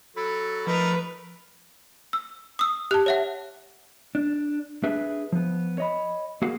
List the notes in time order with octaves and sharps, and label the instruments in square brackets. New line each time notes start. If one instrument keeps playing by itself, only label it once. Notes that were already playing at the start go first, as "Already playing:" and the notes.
[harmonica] F#3 [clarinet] A4 [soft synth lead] B5
[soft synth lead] F3 [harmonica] A3 D#4 A#4 [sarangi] B4
[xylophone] E6
D#6 E6
[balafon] G4 A5 [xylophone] F#6
[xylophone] C#5 E5 F#5
[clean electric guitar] D4
D4 G#4 B4 E5
F3 B3
C#5 D#5 B5
A#3 F#4 G#4 F5 F#5